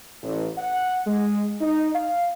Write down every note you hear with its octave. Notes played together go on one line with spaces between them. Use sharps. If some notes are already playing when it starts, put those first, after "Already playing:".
A1
F#5
G#3
D#4
F5